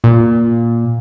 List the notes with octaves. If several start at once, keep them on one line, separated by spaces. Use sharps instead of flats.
A#2